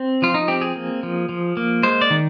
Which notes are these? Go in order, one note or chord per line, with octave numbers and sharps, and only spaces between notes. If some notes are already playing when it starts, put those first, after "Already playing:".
Already playing: C4
F3 F4
D#4
C4 G4
G#4
A#3
F3
F3
A#3
G#3 C5
D5
D#3